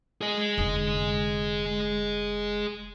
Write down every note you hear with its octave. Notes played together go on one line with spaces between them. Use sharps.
G#4 D#5
F1 D3